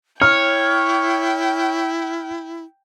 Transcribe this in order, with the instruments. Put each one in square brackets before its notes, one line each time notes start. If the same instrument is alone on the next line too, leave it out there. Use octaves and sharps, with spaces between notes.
[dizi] E4 [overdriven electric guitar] C#5 [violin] G5 [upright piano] F6